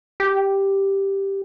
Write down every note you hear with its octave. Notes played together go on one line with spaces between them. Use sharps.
G4